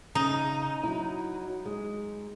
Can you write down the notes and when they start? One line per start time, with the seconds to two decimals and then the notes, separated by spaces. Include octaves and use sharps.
0.15 C#3 D#4
0.83 F#3 E4
1.66 G#3